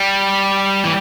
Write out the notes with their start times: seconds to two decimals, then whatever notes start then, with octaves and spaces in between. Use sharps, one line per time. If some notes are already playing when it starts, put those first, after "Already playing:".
Already playing: G3
0.84 E3